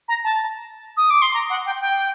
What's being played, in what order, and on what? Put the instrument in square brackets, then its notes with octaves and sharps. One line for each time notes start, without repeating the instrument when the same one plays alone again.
[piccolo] A#5
A5
D#6
D6
C6
A#5
F#5
G5
G5